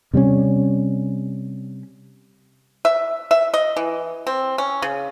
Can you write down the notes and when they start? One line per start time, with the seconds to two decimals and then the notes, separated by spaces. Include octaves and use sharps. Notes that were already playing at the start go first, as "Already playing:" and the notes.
0.13 C3 G3 A3 C#4
2.85 E5
3.31 E5
3.54 D#5
3.77 E3
4.27 C4
4.58 C#4
4.82 C#3